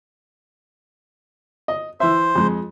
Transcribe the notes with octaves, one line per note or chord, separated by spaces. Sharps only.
D#5
E3 C5 E5
F2 G#3